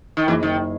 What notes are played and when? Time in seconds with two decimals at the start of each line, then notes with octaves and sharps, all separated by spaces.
0.17 D#3
0.28 F#1 E3
0.42 F#1 D#3